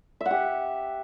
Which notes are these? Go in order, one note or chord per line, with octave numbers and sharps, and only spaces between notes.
E5
F#5
G4